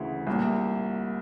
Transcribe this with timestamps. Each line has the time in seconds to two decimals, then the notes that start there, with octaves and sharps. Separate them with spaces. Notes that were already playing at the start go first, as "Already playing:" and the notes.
Already playing: D2 C#3 E3
0.27 C2 A#2